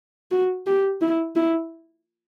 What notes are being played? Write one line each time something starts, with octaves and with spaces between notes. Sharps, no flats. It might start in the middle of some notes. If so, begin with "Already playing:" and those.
F#4
G4
E4
E4